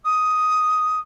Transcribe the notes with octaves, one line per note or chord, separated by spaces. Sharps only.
D#6